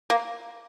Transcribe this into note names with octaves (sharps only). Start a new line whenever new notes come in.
A#3